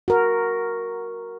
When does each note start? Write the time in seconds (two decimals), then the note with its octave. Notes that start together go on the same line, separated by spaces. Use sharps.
0.08 F#4 A#4